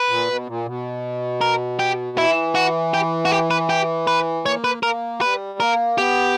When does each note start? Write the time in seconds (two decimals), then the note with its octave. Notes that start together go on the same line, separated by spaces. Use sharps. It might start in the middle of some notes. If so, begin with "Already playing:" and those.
Already playing: B4
0.08 A#2
0.28 B2
0.47 A#2
0.66 B2
1.41 A#4
1.79 G4
2.18 E3 E4
2.55 F#4
2.94 G4
3.25 F#4
3.32 G4
3.51 B4
3.70 G4
4.07 B4
4.45 A#3 C#5
4.64 B4
4.83 A#3 A#4
5.21 G3 B4
5.59 A#3 A#4
5.97 B3 G4